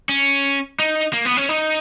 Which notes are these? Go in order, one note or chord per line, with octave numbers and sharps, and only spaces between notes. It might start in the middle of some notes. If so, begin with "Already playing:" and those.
C#4
D#4
A#3
B3
C#4
D#4